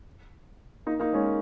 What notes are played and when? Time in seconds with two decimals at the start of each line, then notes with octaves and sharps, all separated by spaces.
0.86 A#3 D#4
0.99 A#3 D#4
1.13 G#3 C#4